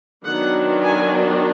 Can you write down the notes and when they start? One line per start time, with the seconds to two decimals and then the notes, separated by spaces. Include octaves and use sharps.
0.25 D#3 F#3 B3 D4 F#5
0.84 G#5